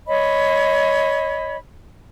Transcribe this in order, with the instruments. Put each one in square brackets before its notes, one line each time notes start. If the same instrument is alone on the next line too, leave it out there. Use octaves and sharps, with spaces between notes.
[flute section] C#5 D#5 B5